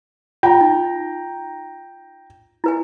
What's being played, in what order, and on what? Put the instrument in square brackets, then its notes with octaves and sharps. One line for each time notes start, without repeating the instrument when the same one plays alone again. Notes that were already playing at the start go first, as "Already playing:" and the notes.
[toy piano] F4 [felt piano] G5 A#5
[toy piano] D#4
E4 B4 G#5